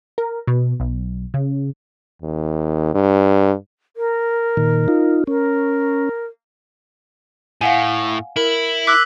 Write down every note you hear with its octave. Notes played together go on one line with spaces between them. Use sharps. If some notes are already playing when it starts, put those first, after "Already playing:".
A#4
B2
B1
C#3
D#2
G2
A#4
A#2 D#3
D#4 F4
C#4 A#4
A2 F5 F#5 G#5
E4 A#4 F#7
D6 E6 F#6 B6